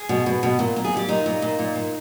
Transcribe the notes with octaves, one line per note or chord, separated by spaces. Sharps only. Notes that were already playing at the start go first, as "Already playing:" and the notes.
Already playing: G#4
B2
B2
B2
A#2
A#2
G#4
A#2 G4
A#2 D#4
A#2
A#2
A#2
A#2